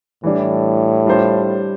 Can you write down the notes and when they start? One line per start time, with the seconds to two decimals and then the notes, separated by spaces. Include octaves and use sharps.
0.23 A2 E3 G3 D4
1.06 G3 D4 F4 C5